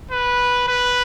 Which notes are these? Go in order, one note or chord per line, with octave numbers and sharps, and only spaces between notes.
B4
B4